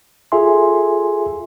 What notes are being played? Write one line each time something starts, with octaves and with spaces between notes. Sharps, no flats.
F4 G#4 A4 E5 G#5 C6